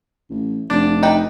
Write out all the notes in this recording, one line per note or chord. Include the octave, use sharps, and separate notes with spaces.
A1
F1 D4
D#4 B4 G5